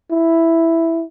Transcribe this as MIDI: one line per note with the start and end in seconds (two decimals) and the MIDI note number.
0.11 1.03 64